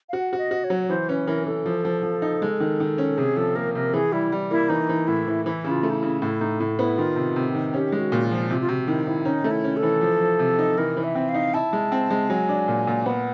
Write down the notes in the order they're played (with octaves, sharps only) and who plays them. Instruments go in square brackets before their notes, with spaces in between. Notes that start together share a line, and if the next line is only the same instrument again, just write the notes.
[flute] F5
[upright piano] F#4 [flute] F#5
[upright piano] F#4
[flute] D#5
[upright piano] F#4
[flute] C#5
[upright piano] F#3
[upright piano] E3 [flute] C5
[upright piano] C#4 [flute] B4
[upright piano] E3 [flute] A#4
[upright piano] E3 [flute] A4
[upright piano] F3
F3
F3
D#4
G#3
D#3
D#3
C#4
[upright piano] C3 [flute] G#4
[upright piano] F3 [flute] A4
[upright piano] A#3 [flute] A#4
[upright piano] C3 [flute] A#4
[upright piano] E3 [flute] G#4
[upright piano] G3 [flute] E4
[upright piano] G3
[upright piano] A#3 [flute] E4
[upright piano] E3 [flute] D#4
[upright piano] E3
[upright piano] A2 [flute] E4
[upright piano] E3
[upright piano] E3 [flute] E4
[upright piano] C#3
[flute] F4
[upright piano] A3
[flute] D#4
E4
[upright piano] C#3
[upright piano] A2 [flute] E4
[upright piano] A2 [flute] D#4
[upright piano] A2 [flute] E4
[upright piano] B3 [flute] E4
[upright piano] D#3 [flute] F4
[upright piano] C3
C3
D#3
[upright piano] C#4 [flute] G4
[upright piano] G#3
[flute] F#4
[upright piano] A#2
[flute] F4
[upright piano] F3
[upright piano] C3 [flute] F4
[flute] F4
[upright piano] C3 [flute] F#4
[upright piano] D#3 [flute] E4
[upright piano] D#3 [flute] E4
[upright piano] C#4 [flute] D#4
[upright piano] A3
[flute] E4
[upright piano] C#4
[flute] A4
[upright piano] E3
F3
F3
C3
D#4
[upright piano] E3 [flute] A#4
[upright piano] E3
[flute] E5
[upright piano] C4
[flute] F5
[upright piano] D#4
[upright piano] E4 [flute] A5
[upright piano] G#3
C4
G#3
[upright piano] F#3 [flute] G#5
[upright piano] D4
A#2
A#2
[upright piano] B3 [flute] F#5